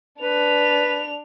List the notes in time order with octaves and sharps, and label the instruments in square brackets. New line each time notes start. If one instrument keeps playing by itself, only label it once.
[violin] D4 F7 [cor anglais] B4